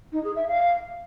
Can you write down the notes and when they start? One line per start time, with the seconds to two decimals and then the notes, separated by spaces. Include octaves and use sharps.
0.12 D#4
0.24 G#4
0.35 E5
0.47 F5